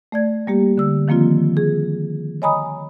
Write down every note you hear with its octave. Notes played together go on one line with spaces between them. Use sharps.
A3 D5 G#6
G3 A#3 G4
D3 E6
D#3 F3 A#3 C4 F4
G#4
C#5 D#5 G#5 A#5 B5 D#6